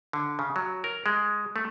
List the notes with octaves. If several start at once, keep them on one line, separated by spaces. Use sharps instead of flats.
D3
C#3
F#3
A#4
G#3
A3